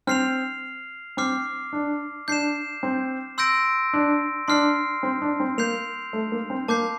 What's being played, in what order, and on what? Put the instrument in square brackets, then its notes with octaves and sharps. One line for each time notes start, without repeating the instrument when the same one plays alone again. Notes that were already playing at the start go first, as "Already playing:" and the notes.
[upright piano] C4 [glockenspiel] F6 C7 F7
[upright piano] C4 [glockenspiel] D6 F6 C7
[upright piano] D4
[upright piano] D4 [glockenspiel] G6 C7 E7
[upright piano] C4
[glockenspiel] C6 E6 G6 A#6 D7
[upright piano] D4
[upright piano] D4 [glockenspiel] C6 F6 C7
[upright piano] C4
D4
C4
[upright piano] A#3 [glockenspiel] G6 C7 F7
[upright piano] A3
A#3
C4
[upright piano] A#3 [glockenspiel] A5 D6 G6 C7